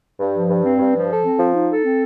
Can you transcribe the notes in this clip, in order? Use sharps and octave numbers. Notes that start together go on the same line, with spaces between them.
G2
F3
G2
C4
G2
F3
A4
C4
F3
D#4
A4
C4